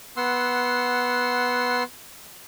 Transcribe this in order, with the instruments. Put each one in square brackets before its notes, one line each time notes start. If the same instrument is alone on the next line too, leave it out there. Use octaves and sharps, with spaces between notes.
[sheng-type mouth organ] B3 F#5 C6 E6